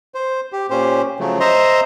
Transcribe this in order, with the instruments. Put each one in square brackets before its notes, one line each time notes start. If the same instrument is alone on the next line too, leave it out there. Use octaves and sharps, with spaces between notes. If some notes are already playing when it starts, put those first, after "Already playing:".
[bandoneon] C5
G4
A#2 C#4 G4 C5
C#3 F3 F#3 A3
C5 D#5 E5 A#5 C6